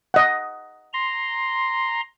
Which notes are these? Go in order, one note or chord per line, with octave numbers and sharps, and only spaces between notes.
D#5 F#5
A#5 C6